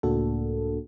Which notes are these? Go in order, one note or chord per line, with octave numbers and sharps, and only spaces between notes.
C#2 A2 A#3 D4 F#4 A4